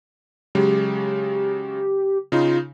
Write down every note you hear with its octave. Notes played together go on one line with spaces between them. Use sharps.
C#3 F#3 G#3 G4
C#3 D#4 F4